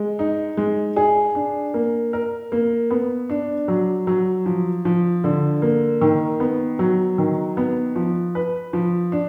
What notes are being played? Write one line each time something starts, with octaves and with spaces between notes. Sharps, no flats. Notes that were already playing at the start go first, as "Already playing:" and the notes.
Already playing: G#3
D#4
G#3
G#4
D4
A#3
A#4
A#3
B3
D4
F#3
F#3
F3
F3
D3
A#3
D#3
B3
F#3
D#3
B3
F3
B4
F3
D4